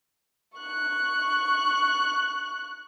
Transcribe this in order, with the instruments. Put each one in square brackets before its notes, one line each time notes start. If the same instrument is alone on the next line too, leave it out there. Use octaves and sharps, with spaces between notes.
[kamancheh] C#6 F#6